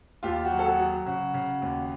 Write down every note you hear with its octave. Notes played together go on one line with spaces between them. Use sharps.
D#2 F4 G4
F#4
F#3
A4
F#4 G#4
F#3
C#3 F#4
C#3
D#2